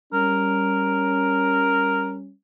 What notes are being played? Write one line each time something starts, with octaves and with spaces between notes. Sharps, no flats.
G3 C#4 A#4